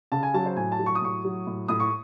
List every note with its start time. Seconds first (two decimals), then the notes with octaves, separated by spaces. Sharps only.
0.12 C#3 A5
0.23 G#5
0.34 F#3 A5
0.46 C5
0.56 A2 G#5
0.72 A5
0.79 F#3
0.86 C#6
0.95 D#6
1.02 A2 C#6
1.25 F#3
1.47 A2
1.68 A2 D#6
1.80 C#6